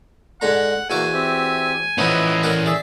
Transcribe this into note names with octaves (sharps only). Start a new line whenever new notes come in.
G#2 D3 F#5 A#5
E2 A#3 F#4 G#5 D6 E6
C4 G4 E5
E3 F3 B3 C#4 B4 D#5 E5
A#4 D5 F#5
G#4 D5 E5